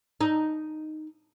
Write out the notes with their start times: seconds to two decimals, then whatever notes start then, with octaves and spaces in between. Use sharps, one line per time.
0.21 D#4